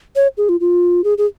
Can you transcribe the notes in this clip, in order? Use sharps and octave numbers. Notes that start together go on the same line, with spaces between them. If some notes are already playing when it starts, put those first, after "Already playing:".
C#5
G#4
F4
F4
G#4
G#4